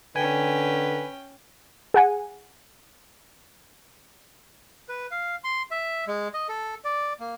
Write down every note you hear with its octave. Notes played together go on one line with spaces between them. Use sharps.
D3 C#4 B4 G5 G#5
G#4 F#5 G#5
B4
F5
C6
E5
G#3
D#5
A4
D5
A#3